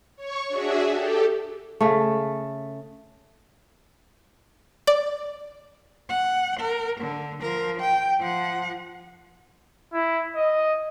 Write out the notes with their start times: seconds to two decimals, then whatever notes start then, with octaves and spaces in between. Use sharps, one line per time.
0.16 C#5 C#6
0.48 D4 F#4 G#4 E5
0.88 G4 A4
1.81 C#3 A3
4.87 D5
6.10 F#5
6.60 A#4
7.01 D3
7.41 F3 A#4
7.81 G5
8.20 F3 F#5
9.93 E4
10.35 D#5